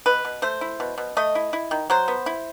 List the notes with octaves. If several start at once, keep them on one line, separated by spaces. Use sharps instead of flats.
B2 B4
B2
A3 C5
E4
B2
B2
A3 D#5
E4
E4
D#3
F#3 C5
B3
E4